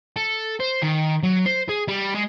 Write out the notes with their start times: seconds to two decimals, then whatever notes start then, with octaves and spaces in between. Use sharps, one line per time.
0.16 A4
0.60 C5
0.83 D#3
1.23 F#3
1.46 C5
1.69 G#4
1.88 G3
2.14 G#3